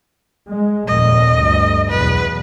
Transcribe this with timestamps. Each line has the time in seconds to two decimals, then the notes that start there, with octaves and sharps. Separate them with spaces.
0.47 G#3
0.87 F1 D#2 A#2 D#5
1.35 D2 G2
1.89 B1 E2 B4